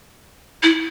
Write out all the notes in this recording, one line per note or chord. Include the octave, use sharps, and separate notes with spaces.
E4